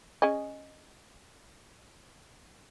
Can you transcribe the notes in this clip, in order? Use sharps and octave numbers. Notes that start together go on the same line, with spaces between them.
C#4 G#4 D#5